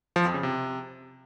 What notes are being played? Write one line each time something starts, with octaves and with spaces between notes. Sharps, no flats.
F3
F2
C#3
C3